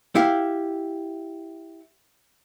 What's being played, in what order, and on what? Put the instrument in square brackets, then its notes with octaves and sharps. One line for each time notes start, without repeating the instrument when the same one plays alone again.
[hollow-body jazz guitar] E4 G4 F5